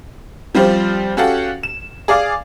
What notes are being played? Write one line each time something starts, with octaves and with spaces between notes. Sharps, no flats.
F3 G3 C4 F4 G4 C5
C#4 F#4 G4 A4 F5 F#5
E7
G#4 D5 F5 D6